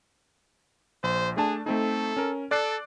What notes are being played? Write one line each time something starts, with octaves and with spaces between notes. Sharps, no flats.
A#1 C5
A3 D4 G#4 A5
A3 C4 D#4 A4
C#4 A#4
A4 D5 F#6 C7